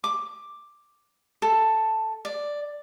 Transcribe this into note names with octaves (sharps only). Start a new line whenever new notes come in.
D6
A4
D5